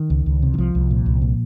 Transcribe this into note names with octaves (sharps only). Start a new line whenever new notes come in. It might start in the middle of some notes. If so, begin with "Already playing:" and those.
Already playing: D#3
C#2
C#2
C3
D#3
C2 F3
C2
A#2
C2
A#2